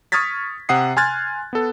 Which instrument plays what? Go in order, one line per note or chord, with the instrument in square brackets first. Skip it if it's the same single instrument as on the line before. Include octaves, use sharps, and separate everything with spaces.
[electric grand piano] C#6 D#6 F6 G#6 A6 B6
C3 F#5 D#6 C7
G#5 C6 F6 F#6 G#6 A6
B3 A4